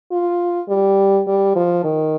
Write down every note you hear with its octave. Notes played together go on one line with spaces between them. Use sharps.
F4
G3
G3
F3
D#3